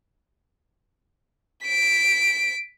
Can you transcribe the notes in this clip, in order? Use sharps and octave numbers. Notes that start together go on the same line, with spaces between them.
B6 D7